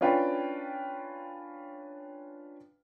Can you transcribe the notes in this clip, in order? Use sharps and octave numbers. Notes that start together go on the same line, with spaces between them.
C#4 D4 F4 B4 G5